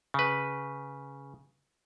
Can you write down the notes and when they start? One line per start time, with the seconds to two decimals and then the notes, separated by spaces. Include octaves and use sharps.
0.14 C#3 B4